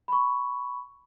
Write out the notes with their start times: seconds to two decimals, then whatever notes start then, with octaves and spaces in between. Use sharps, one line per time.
0.08 B5 C#6